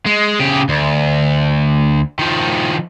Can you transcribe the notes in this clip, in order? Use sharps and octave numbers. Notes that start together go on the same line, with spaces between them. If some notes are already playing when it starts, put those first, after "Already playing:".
G#3
C#3 G4
D2
D#3 F3